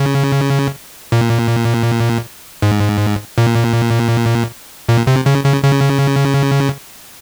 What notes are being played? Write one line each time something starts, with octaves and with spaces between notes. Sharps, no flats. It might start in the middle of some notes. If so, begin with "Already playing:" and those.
Already playing: C#3
A#2
G#2
A#2
A#2
C3
C#3
C#3
C#3